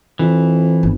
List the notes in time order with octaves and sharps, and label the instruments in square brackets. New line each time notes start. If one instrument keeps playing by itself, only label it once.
[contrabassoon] F2 [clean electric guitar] E3
[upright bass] G1